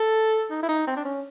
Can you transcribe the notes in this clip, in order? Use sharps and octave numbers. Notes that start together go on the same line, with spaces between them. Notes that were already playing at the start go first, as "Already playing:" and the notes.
Already playing: A4
D#4
E4
D#4
C4
D4
C#4